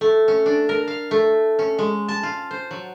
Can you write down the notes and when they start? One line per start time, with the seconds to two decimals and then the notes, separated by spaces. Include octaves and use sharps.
0.01 A3
0.28 C#4
0.46 D4
0.69 A#4
0.88 F5
1.11 A3
1.59 C#4
1.79 G#3
2.08 A5
2.23 F4
2.51 C5
2.71 F#3